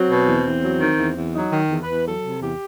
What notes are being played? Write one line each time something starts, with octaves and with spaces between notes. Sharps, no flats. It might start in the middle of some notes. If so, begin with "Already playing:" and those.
Already playing: F#3 C4
B2
E2
E2
F#3
D#3
E2
E2
F#3 D#4
D#3
E2
B4
E2
F#3 A4
C3
E2 G4